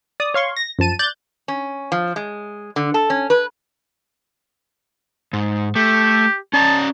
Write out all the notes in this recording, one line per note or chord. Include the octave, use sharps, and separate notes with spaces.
D5 D#6
C#5 F5 C6 C#6
A#6
F#2 F3 A5 D#7
D5 F#6 G6 A6
C#4
F3
G#3
D3
A4
C#4
B4
G#2
A3 G4
C#4 D5 A5 A#5